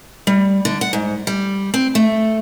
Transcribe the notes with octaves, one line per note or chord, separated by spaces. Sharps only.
G3
D3
F#5
G#2
G3
C4
A3